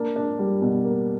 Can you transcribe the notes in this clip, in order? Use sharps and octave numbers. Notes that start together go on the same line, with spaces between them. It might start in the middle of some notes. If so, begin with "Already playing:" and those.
Already playing: A#3 D4
D4
G3
B2
A#3